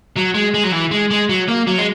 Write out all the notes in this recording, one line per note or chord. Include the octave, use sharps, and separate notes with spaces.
F#3
G#3
G#3
F#3
E3
G#3
G#3
F#3
A#3
F#3
G#3